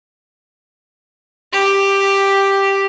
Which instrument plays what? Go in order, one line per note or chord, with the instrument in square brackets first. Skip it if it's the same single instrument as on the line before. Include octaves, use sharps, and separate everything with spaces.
[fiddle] G4